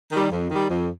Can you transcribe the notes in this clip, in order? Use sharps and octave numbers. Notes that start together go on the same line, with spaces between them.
D#3 G3
F2
D#3 G3
F2